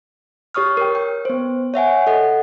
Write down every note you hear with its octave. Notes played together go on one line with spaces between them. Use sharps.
G4 C#5 C#6 D#6 F6
A#4 C#5 G5
G5
B3 C5
C#5 E5 F#5 G#5
A4 D#5 F#5